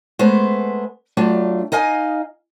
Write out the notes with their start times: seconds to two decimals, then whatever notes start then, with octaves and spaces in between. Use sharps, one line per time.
0.19 G#3 A3 B3 C5
1.17 F#3 A3 D4 F4
1.72 D#4 D#5 F5 G#5